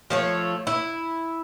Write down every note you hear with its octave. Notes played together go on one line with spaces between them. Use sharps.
F3 A3 C#5
E4